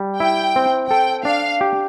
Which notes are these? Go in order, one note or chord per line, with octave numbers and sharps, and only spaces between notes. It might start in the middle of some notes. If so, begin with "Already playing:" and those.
Already playing: G3
E4 G5
C4
A4 G5
D4 F5
G4